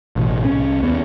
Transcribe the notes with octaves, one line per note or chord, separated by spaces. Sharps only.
A1 B2
C2 C#4
D#2 B3